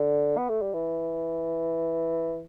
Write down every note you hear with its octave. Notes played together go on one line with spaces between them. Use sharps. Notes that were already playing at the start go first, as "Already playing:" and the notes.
Already playing: D3
B3
A3
G3
E3